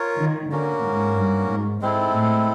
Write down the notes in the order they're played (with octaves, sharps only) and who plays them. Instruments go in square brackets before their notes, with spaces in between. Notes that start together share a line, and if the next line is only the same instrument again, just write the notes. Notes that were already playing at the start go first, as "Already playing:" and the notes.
Already playing: [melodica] F4 A#4 C#5
[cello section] D#3
[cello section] D3 [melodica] A#3 C#4 F#4 A#4
[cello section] G#2
G2
G#2
[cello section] G#2 [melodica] G#3 C4 E4 A4
[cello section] A2